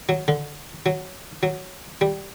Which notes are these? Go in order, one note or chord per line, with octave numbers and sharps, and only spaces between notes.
F#3
D3
F#3
F#3
G3